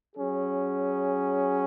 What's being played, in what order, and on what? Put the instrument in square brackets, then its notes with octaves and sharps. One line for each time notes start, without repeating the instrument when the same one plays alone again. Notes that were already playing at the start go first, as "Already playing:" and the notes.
[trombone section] F#3 C#4 G#4